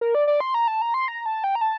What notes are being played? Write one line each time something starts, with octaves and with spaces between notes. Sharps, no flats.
A#4
D5
D5
C6
A#5
A5
A#5
C6
A#5
A5
G5
A#5
A5